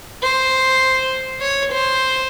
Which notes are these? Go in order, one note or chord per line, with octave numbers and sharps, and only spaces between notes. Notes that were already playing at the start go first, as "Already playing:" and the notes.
C5
C#5
C5